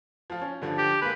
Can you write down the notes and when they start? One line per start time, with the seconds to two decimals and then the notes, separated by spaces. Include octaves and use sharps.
0.30 F3 F4
0.42 C#4
0.62 G2 D3 F3
0.78 G4
1.02 G#3 A#3 B4